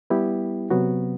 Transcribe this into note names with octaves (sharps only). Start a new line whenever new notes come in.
G3 B3 E4 G4
C3 F#3 B3 F#4